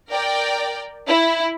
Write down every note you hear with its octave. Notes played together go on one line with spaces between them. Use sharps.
A#4 D5 G5
E4